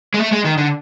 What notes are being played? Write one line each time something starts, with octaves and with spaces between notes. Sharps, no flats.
G#3
A3
G#3
D#3
D3